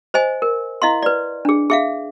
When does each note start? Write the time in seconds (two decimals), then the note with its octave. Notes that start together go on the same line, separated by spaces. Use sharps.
0.14 C5 D#5 G#5
0.42 A#4
0.82 E4 D#5 F5 C6
1.02 B4 D5
1.45 D4 G#4
1.70 G#4 E5 F5